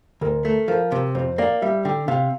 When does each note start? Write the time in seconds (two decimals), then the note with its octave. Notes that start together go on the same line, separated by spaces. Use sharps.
0.21 D2 A#4
0.45 A3
0.68 F3 A#4
0.92 C3
1.15 F2 C5
1.38 A#3 D5
1.62 G3 E5
1.85 D3 G5
2.08 C3 F5